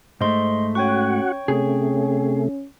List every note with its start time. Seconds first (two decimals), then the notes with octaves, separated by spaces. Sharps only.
0.21 G#2 A3 C5 D#5 C6
0.75 C#4 F#4 C#5 F#5 G5 C#6
1.48 C3 A3 C#4 G#4